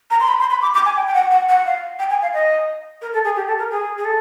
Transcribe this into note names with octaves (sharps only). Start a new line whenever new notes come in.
A#5
C6
B5
C6
B5
D6
D6
G#5
G5
G5
F#5
F#5
F#5
F5
G5
G#5
F5
D#5
A#4
A4
G#4
G4
A4
A#4
G#4
G#4
A4